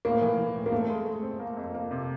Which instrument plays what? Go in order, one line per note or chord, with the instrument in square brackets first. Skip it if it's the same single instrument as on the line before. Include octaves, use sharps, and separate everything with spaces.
[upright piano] A2 [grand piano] A#3
[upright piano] E3
E3
A2
[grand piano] A#3
[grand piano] A3 [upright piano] C4
[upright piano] G#3
G#3
C4
A#3
F2
A#3
C3